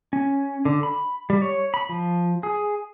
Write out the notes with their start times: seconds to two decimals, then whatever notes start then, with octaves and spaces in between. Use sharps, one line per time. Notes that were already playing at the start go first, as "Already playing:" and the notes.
0.13 C#4
0.65 D3
0.83 B5
1.30 G3
1.42 C#5
1.74 B5
1.89 F3
2.43 G#4